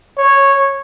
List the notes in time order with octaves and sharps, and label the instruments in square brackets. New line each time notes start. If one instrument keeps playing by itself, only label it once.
[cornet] C#5